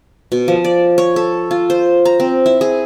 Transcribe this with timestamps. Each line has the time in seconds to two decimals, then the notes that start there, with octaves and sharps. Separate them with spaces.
0.32 B2
0.48 F3
0.64 D5
0.98 C#5
1.16 A4
1.51 F4
1.70 C5
2.05 A#5
2.20 C4
2.46 E4
2.61 G#4